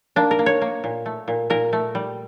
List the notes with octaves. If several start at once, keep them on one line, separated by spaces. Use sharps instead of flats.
A#3 D4
A#4
A#3
C#5
A#3
A#2
A3
A#2
A#2 A#4
A3
G3